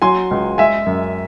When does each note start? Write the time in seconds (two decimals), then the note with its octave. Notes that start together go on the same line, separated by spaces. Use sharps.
0.02 F#3 G#5 C6
0.31 C#2
0.58 G#3 E5 G#5
0.86 F#2